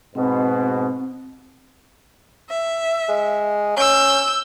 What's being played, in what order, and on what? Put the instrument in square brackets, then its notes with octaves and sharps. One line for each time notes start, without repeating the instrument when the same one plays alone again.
[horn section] G#2 B2 [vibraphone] C4
[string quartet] E5
[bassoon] G#3
[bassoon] C#4 [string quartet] E6 G6